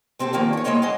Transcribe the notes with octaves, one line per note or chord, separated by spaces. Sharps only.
G#3 C4 E4 F#4 G4 A4
A#2 D#3 F3 A#3 B3
G#4 C#5
G#3 A#3 E4 G#4 C#5 D#5
F#2 F3 D#5 F5 F#5 G#5